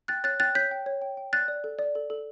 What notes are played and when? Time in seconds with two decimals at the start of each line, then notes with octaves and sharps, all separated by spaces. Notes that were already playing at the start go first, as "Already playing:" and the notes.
0.08 G5 F#6 A6
0.24 C#5 F#6 A6
0.40 G5 F#6 A6
0.55 C#5 G6 B6
0.71 G5
0.86 C#5
1.02 G5
1.17 G5
1.33 D5 F#6 A6
1.48 D5
1.64 A4
1.79 D5
1.95 A4
2.10 A4